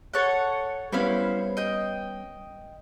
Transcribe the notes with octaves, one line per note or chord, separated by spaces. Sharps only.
A4 C#5 F#5
G3 B3 C#4 E4 C5 F5
D#5 G5